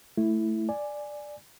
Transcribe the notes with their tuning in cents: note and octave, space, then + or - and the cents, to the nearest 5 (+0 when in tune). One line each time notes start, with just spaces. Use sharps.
A3 +0 E4 +0
D5 +5 G#5 +0